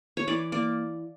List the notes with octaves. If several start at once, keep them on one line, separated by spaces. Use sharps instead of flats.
C#5
E3 D5
A#3 D5